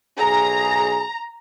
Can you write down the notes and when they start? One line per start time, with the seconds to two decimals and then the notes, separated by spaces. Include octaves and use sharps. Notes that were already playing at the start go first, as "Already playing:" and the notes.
0.19 B1 G#4 A#5